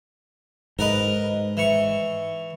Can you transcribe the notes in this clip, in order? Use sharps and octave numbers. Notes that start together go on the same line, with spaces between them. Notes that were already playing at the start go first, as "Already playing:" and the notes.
G#2 A#4 B4 D#5
E3 C#6